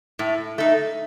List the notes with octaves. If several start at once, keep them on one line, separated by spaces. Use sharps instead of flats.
A2
A3 D#4